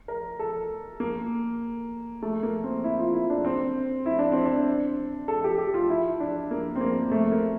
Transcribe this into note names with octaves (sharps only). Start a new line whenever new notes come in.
A#4
A4
A#3
A3
A#3
C4
E4
F4
E4
D4
C4
E4
D4
C4
D4
A4
G4
G4
F4
E4
D4
A#3
C4
A#3
A3
A#3